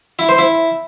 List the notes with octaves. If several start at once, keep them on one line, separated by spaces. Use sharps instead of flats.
E4
C5
E4